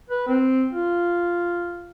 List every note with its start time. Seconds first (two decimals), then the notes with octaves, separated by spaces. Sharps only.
0.10 B4
0.27 C4
0.73 F4